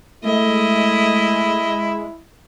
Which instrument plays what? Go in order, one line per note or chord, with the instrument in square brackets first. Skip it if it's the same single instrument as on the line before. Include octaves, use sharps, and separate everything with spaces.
[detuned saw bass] G#3 [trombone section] A3 [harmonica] E4 [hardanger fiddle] D#5